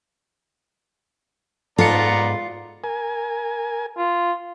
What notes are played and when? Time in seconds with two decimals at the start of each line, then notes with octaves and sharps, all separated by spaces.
1.78 G#2 B3 F4 A4 D5 A#5 C#7
2.84 A#4 G#5
3.98 F4